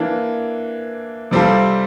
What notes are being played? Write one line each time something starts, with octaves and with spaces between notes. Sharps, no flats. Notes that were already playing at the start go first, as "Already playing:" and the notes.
Already playing: E3 A#3 D4
C3 G3 C4 F4 A4